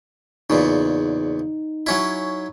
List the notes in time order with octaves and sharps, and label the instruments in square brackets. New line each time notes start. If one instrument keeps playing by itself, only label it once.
[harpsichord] E2 A#2 C#3 [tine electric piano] D#4
[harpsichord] F#3 C#4 E4